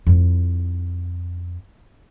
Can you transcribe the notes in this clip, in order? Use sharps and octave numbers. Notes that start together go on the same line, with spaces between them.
F2 E4